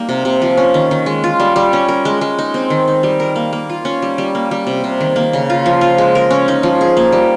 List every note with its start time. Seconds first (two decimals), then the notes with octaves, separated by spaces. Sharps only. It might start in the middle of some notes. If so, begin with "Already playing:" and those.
Already playing: G3 A#3 D#4 G4
0.09 C3
0.25 C3
0.42 F3
0.57 C#4
0.74 D#3
0.91 D#3
1.06 G#3
1.24 F4
1.40 G3
1.56 G3
1.73 C#4
1.88 A#4
2.05 G#3
2.21 G#3
2.39 D#4
2.54 C4
2.70 D#3
2.88 D#4
3.03 G3
3.20 A#4
3.36 A#3
3.53 A#3
3.70 F4
3.85 C#4
4.02 G3
4.18 G3
4.35 A#3
4.51 G3
4.67 C3
4.84 C3
5.00 D#3
5.16 A#3
5.33 C#3
5.50 F4
5.66 F3
5.81 F4
5.98 G#3
6.15 A#4
6.31 C#4
6.48 D#4
6.63 F3
6.81 G#4
6.97 A#3
7.12 G3